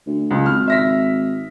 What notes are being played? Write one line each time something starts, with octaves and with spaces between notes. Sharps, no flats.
D2
C#2
G#1 F6
E5 A#6 B6